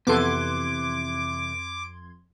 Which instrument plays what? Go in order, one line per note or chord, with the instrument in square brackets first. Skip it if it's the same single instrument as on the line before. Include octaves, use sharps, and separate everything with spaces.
[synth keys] F2 C6 G#6 [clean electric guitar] C3 E3 [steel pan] B3 A4 [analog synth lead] D6